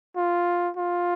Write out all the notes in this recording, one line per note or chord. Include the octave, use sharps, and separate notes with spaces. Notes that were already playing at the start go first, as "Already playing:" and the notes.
F4
F4